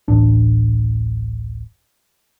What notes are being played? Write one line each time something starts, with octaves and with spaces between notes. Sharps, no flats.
D1 A1 D4